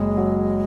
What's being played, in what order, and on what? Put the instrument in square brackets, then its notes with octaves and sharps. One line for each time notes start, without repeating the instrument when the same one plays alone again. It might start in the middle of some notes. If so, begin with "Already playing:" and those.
Already playing: [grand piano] F#1 [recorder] G#3
[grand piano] F#3